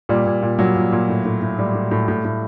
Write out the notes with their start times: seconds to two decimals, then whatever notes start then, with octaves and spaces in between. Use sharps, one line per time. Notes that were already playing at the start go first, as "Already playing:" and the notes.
0.09 A#2 G3
0.26 A#2
0.42 A#2
0.59 A#2 F#3
0.75 A#2
0.92 A#2
1.09 A2
1.25 A2
1.42 A2
1.58 A2 G3
1.75 A2
1.91 A2
2.08 A2
2.25 A2